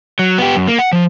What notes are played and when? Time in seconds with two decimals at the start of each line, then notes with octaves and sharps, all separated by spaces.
0.19 F#3
0.38 B3 G4
0.56 F#2
0.68 A#3
0.79 F#5
0.92 F3